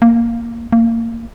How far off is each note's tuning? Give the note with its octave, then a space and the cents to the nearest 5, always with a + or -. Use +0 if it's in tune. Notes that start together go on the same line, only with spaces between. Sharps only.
A#3 -5
A#3 -25